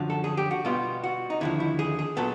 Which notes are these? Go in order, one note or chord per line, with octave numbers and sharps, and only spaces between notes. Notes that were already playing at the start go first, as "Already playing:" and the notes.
Already playing: F#2 D3 F3 F#4
A4
G#4
G4
F#4
B2 G3 B3 F4
F#4
D#4
D#2 D3 F3 E4
E4
G#4
G#4
A#2 F#3 B3 A4